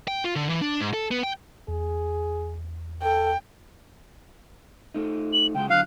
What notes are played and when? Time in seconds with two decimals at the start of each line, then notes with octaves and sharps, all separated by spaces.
0.08 G5
0.24 F4
0.36 D3
0.49 E3
0.62 D4
0.81 G#2
0.94 A4
1.11 B3
1.23 G5
1.68 E2 G#4
3.03 A4 G5
4.94 A3 D#4
5.33 F#7
5.55 C#3 G#3 F#4 G5
5.70 D3 F#3 F5 F#6